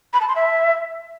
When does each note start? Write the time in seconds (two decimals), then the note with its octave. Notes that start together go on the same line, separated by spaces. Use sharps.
0.13 B5
0.21 A5
0.28 C6
0.36 E5